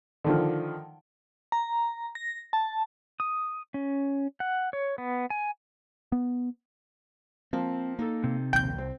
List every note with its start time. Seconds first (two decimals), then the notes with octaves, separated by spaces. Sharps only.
0.24 D3 D#3 F3
1.52 A#5
2.15 A#6
2.53 A5
3.20 D#6
3.74 C#4
4.40 F#5
4.73 C#5
4.98 B3
5.30 G#5
6.12 B3
7.53 F3 A#3 C4
7.99 A#3 D#4 A4
8.24 C3
8.53 A#1 D#2 G5 G6
8.78 C2 C4